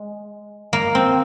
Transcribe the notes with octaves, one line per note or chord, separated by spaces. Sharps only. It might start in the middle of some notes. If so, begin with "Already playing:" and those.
Already playing: G#3
A#3
C4